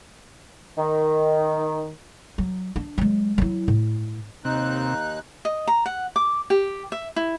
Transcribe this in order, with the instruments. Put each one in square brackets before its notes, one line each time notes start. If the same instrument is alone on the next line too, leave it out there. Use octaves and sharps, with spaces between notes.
[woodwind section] D#3
[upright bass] F#3
D4
F#3 G#3
F#3 E4
A2
[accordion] D#2 D#4 F#6 [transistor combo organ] C3
[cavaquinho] D#5
A#5
F#5
D6
G4
E5
E4